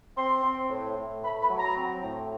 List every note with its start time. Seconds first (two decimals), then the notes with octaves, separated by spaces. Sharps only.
0.16 C4 C6
0.43 C4
0.70 A2
0.96 A2
1.23 A3 B5
1.41 B5
1.50 F#3
1.59 A#5
1.76 C4
2.02 A2